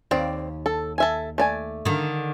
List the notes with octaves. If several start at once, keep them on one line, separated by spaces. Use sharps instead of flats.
D#2 C4 D5
A4
A4 E5 G#5
A3 D5 G#5
D3 D#3